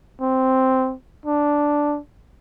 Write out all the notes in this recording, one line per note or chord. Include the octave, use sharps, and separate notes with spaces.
C4
D4